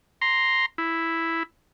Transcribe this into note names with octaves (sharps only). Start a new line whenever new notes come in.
A#5 C6
E4